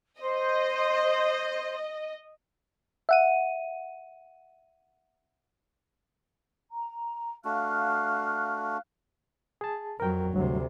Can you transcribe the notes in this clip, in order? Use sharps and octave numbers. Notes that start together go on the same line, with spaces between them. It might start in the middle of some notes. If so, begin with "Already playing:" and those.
C5 D#5
E5 F#5 D#7
A#5
A3 D4 F#4 F5 F6 F#6
G#4 A5
F2 F#3 A#4 G5
D2 G2 C3 F#3